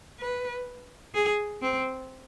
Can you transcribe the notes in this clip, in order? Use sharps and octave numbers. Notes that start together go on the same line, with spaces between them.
B4
G#4
C4